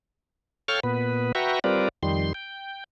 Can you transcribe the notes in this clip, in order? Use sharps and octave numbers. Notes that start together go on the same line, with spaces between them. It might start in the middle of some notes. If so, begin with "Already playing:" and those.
A4 C#5 F5 G5 C#6 F6
A#2 B3 B4
F#4 B4 E5 G5 A#5 C#6
G3 C4 F4 A#4 B4 D5
F2 D#3 G3 C6
G5